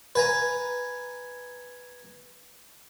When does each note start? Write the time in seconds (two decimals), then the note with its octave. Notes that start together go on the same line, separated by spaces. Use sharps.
0.15 B4 G#5 A#5